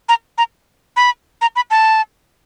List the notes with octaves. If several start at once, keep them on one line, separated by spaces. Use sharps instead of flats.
A#5
A#5
B5
A#5
B5
A5